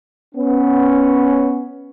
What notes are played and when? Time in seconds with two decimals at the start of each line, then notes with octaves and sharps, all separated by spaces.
0.35 B3 C#4